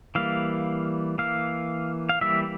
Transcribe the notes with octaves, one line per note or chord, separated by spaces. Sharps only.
E3 G3 A#3 F5
E3 A#3 F5
F5
E3 G3 A#3 E5